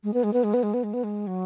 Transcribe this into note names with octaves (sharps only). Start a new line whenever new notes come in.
G#3
B3
G#3
B3
G#3
B3
G#3
B3
G#3
B3
G#3
F#3